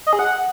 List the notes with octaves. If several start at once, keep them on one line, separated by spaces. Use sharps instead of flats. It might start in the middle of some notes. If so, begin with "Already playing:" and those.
D#5
G#4
F#5